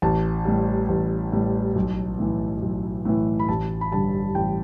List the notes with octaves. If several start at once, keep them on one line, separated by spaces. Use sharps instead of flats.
A1 A5
A2 G3
A1
A2 G3
B1
A2 E3
B1
A2 E3
B5
A1 A5
B5
G2 D3 G3 A5
A1 G5